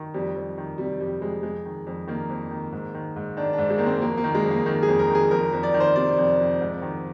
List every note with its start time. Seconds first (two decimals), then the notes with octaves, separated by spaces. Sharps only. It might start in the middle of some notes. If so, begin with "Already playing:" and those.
Already playing: D#3
0.14 F2 G3
0.36 F2
0.58 D#3
0.78 C3 G3
1.00 F2 G3
1.22 F2 G#3
1.43 F2 G#3
1.65 D#3
1.87 F2
2.07 D#3 A#3
2.30 F2
2.50 D#3
2.72 G#2
2.94 D#3
3.16 G#2
3.37 D#3 D4
3.53 D4
3.58 G#2
3.70 G#3
3.78 D#3 A#3
3.86 C4
4.02 F2 A#3
4.17 A#3
4.24 D#3
4.35 G#3
4.44 F2
4.51 A#3
4.66 D#3
4.83 G#4
4.88 F2
4.99 A#4
5.10 D#3 G#4
5.31 F2 A#4
5.53 F2
5.63 D5
5.74 D#3
5.80 C5
5.96 C3 D5
6.18 F2
6.39 F2
6.61 G#2
6.82 D#3